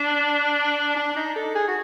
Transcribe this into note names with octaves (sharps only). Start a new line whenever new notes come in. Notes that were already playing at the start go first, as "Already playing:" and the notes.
Already playing: D4
D4
D#4
A4
G#4
F#4